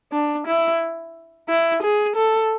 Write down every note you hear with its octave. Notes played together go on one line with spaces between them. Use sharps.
D4
E4
E4
G#4
A4